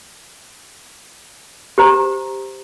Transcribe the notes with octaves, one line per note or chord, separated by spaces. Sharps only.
G4 C5 A#5